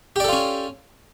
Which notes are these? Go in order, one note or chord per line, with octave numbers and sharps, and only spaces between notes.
C#4 F4 G4 A4 D5